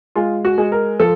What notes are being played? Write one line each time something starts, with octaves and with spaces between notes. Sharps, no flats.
G#3 F4
F#4
G#3
A#4
F3 A4